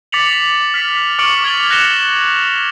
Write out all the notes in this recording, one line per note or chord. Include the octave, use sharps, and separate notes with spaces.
D6 A6 B6 C#7 F7 F#7
F6 B6
C#6 D6 F6 C#7 D7 F#7
D6 G#6 A6 D7 F7 G7
F#6 A#6 C#7 E7 G7